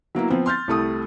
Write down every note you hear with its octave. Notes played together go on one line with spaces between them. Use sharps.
F#3 A#3 B3 E4
F3 B3 C4
C6 F6 G6 A6
C2 G3 A3 E4 D#6